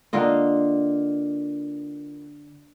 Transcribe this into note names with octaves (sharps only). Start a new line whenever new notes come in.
D3 A#3 F4 D#5